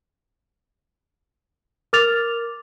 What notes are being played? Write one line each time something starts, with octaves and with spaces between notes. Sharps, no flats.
A#4 D6 F6 A6 F7